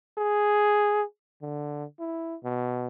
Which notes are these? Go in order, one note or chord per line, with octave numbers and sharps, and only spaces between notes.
G#4
D3
E4
B2